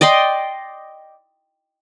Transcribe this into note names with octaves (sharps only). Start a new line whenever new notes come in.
D5 D#5 G5 C6